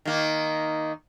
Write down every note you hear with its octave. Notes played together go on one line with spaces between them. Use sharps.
D#3 A#3